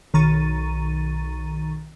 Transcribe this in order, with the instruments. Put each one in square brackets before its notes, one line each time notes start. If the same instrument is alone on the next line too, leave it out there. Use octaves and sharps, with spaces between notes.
[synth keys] B1 D#3 A#5 C#6 A6 D#7